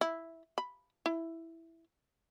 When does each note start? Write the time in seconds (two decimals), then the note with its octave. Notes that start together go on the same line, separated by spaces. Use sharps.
0.01 E4
0.58 B5
1.06 E4